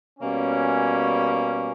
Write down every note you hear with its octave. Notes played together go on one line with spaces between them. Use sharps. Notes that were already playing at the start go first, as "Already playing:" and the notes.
B2 G3 A#3 C#4